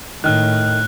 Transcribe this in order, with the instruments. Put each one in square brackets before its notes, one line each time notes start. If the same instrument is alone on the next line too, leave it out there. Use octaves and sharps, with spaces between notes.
[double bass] A2 [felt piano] D#3 [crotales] F6 F#6